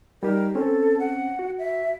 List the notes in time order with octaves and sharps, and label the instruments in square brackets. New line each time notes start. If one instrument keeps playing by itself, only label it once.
[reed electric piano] G3 D#4 G4 [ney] A#4
[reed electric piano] C4 C#4 [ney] A4
[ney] F#5
[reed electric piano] F#4
[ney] E5